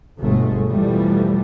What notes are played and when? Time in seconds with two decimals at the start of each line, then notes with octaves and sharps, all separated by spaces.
0.20 G1 B2 G#3 A3
0.68 E2 B2 E3 F3 G3 A3